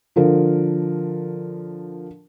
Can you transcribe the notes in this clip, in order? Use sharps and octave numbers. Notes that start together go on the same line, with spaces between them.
D3 F3 A#4